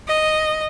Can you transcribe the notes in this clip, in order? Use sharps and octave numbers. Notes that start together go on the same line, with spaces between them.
D#5